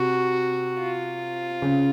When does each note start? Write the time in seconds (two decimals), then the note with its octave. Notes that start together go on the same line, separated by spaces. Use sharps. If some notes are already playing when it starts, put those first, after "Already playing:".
Already playing: C3 F#4
0.80 F4
1.62 C#3